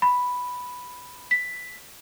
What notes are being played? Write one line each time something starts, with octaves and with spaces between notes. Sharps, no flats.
B5
B6